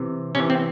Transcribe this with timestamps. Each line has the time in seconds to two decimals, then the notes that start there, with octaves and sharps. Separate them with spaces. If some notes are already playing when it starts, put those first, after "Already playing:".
Already playing: C3 E3
0.35 C3 E3 C#4
0.50 C4